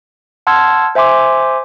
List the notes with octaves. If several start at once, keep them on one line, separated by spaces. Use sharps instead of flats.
F#5 A5 C6 E6 F6 G#6
C5 E5 G#5 C6 D6